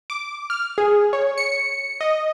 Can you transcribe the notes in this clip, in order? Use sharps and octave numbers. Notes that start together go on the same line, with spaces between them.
D6
F6
G#4
C#5
C#7
D#5